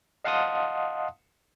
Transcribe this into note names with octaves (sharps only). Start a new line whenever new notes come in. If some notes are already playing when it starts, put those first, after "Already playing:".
D#5 F5 F#5 A5 C6 D#6